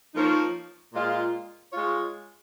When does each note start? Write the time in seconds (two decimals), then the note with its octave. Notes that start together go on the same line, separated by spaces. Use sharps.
0.15 F3 A#3 D#4 A#4 C#5
0.94 A#2 G#3 F4
1.72 G#3 F4 C#5